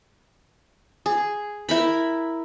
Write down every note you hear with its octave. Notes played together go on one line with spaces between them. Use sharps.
G#4
E4 A#4 B5